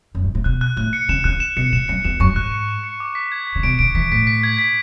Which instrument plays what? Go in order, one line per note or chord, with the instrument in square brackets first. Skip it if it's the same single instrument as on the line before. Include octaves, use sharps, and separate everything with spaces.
[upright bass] F#2
G#2
A2
[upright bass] B2 [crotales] F#6
[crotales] F#6
[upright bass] A2 [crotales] F#6
[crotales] C#7
[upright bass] C#3 [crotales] E7
[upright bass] C#3 [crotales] F#6
[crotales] E7
[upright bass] B2 [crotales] C#7
[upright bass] A2 [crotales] E7
[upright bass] F#2 [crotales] C#7
[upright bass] E2 [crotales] E7
[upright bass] F#2 [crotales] C#6
[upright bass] G#2 [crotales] F#6
[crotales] C#7
E7
C#7
D6
B6
G#6
B6
[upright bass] C#3
[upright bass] B2 [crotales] D7
[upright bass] D3 [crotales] D7
[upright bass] E3 [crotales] B6
[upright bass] A2 [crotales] B6
[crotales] B6
G#6
B6